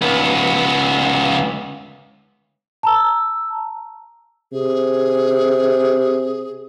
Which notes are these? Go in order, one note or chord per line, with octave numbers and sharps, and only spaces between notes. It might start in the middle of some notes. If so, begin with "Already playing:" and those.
C#2 B3
A5 A#5 E6
C3 G#4